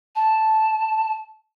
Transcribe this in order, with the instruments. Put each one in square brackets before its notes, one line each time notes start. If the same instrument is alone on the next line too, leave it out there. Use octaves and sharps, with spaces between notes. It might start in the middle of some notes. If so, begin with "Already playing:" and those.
[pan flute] A5